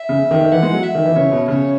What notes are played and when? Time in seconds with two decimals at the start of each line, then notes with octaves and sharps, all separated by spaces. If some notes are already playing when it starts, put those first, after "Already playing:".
Already playing: E5
0.09 C#3
0.31 D#3
0.41 D#3
0.52 E3 F#5
0.63 G#3
0.73 F#3
0.84 E5
0.95 D#3
1.05 E3
1.15 C#3 C#5
1.32 B2
1.48 C#3 C#5